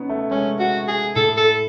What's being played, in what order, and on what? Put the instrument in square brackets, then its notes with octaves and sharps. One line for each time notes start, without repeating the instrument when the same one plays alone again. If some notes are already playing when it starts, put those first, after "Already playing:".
Already playing: [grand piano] B3 C#4 D#4
A3
[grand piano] G#3 [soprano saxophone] C#4
[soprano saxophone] F#4
G#4
[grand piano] A2 [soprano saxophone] A4
[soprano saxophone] A4